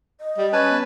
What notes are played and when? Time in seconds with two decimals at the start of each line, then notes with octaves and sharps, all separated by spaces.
0.20 D#5
0.38 G3
0.53 C#4 B4 G#5 A5
0.70 B3